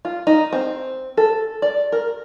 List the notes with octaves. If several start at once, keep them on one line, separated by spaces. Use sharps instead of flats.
F4
D#4
C4
A4
D5
A#4